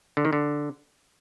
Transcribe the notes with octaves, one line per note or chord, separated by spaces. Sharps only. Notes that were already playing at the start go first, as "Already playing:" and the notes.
D3
D#3
D3